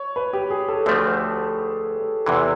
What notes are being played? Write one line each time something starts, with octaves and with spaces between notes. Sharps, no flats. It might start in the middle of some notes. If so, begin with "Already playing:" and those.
Already playing: C#5
B4
G4
G#4
A4
D2 D3 F3 A3 C4
E2 C3 E3